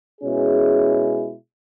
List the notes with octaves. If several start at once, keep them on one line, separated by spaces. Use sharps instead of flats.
B2 G#3 C#4 E4 G#4